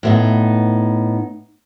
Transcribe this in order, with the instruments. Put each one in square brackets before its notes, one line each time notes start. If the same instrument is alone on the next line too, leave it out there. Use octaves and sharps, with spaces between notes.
[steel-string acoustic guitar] A2 B3 D#4